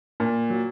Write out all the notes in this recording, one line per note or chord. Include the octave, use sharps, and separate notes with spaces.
A#2
F#3